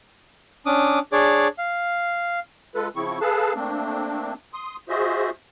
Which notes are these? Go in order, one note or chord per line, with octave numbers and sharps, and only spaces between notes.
C#4 D4 D6 D#6
D4 G#4 C#5 D5 D6
F5
G#3 F4 A4 B4
C#3 F3 C4 E4 C#6
G#4 A4 B4 F5 A5
A3 A#3 C4 D4
C6 D#6
F4 F#4 G#4 C5 D#5 E5